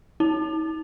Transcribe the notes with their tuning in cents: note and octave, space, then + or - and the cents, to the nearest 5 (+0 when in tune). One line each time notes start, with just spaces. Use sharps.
D#4 +45